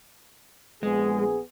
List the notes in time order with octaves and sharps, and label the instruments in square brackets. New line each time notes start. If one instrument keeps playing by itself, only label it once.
[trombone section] A#1 B3 G#4 [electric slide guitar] G#3